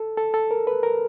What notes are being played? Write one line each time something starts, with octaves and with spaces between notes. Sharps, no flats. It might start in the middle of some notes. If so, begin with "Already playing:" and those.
Already playing: A4
A4
A4
A#4
B4
A#4